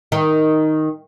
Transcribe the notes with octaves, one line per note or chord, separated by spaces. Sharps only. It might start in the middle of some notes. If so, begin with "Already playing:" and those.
D#3